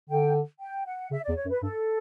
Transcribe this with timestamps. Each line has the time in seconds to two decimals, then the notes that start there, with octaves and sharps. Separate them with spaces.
0.09 D3 G5
0.60 G5
0.86 F#5
1.11 C#3 E5
1.24 E2 D5
1.37 C#5
1.45 F#2
1.50 B4
1.62 G2 A4